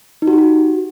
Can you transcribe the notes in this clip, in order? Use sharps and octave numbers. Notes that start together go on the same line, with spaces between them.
D#4
F#4
G4
F#4